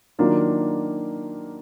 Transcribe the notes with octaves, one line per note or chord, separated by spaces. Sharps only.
D#3 F#3 A#3 D4 F4